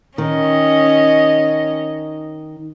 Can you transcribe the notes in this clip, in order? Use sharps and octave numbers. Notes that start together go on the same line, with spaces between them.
D#3 C#4 D#5